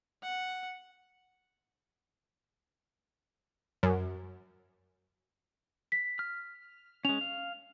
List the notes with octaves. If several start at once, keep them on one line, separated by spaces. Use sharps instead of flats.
F#5
F#2
B6
F6
G#3 C#4 F7
F5